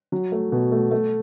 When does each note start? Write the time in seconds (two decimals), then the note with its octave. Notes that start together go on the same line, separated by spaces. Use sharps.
0.12 F#3
0.32 A3
0.52 B2
0.72 A3
0.91 A3